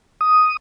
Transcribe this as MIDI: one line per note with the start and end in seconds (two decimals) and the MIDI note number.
0.21 0.57 87